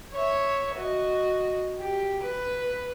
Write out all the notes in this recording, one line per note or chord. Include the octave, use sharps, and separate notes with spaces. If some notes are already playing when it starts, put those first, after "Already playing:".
C#5 E5
F#4 D#5
G4
B4